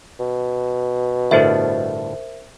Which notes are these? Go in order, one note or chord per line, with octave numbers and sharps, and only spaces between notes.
B2
G1 A2 D4 A#4 C5 E5